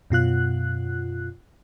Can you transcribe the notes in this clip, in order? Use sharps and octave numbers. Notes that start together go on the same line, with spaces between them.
F#2 B2 F4 F#6